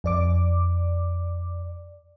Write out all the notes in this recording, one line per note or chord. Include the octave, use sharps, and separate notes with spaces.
F2 D5 D6